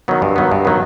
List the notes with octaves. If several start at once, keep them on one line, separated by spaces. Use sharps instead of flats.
D#3 F#3 B3
G2
D#3 F#3 B3
G2
D#3 F#3 B3